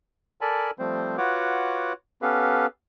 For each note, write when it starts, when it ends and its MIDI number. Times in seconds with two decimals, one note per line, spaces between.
0.41 0.71 69
0.41 0.71 70
0.41 0.71 74
0.41 0.71 80
0.41 0.71 81
0.41 0.71 83
0.79 1.17 53
0.79 1.17 55
0.79 1.17 57
0.79 1.17 60
0.79 1.17 72
1.18 1.93 65
1.18 1.93 66
1.18 1.93 71
1.18 1.93 73
1.18 1.93 78
1.18 1.93 86
2.22 2.66 59
2.22 2.66 61
2.22 2.66 67
2.22 2.66 69
2.22 2.66 71
2.22 2.66 77